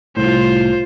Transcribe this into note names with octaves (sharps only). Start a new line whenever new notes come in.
C2 A2 F4 C5